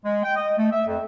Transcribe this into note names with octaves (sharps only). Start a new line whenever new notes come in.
G#3
G5
D#5
A3
E5
F2